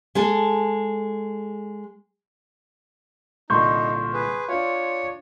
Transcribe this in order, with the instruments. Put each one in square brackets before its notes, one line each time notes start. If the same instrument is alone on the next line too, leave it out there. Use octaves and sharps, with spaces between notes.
[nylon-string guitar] G#3 G#4 A4
[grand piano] C2 A#2 D3 [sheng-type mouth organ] D#4 [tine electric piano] C6 C#6 G6
[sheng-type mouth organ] G#4 B4
[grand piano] D4 F4 [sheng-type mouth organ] C#5